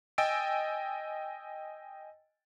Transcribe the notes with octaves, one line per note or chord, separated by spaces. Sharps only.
D#5 G5 G#5 E6 A6 D7